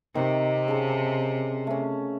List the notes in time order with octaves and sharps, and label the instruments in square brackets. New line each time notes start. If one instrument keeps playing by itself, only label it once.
[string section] C3 [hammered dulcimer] D#3
[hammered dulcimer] C#3 A5
A3 C#4